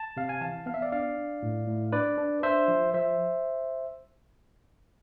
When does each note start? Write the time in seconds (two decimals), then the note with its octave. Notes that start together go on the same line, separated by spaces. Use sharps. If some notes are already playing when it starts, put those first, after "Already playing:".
Already playing: A5
0.17 C3 F5
0.29 G#5
0.41 E3 F5 A5
0.66 B3 F5
0.74 E5
0.82 D5 F5
0.92 D4 D5 F5
1.17 D4
1.43 A2
1.67 A2
1.92 D4 B4 D5
2.18 D4
2.43 D4 C5 E5
2.68 F3
2.94 F3 C5 E5